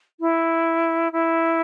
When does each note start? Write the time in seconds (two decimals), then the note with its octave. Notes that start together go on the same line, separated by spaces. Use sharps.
0.20 E4
1.12 E4